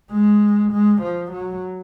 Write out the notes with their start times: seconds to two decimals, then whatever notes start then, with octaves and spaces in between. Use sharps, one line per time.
0.11 G#3
0.72 G#3
1.02 F3
1.32 F#3